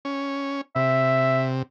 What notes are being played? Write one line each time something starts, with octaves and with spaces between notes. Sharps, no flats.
C#4
C3 E5